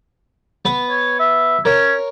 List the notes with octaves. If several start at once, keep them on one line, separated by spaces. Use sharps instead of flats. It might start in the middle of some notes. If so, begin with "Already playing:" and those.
B3 B4
C#5
E5
C#4 A#4 C#5